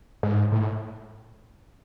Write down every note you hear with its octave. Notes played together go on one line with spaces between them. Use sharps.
G#2
A2